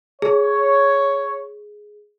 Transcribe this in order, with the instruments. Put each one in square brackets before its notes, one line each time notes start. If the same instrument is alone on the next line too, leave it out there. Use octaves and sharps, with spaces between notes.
[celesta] G#4 [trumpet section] C#5